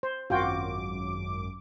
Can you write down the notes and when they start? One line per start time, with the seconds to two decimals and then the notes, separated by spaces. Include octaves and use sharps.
0.03 C5
0.30 G#1 F#2 F4 F#4 G5 D6